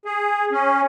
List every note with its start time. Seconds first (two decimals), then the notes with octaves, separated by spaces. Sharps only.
0.05 G#4
0.52 C#4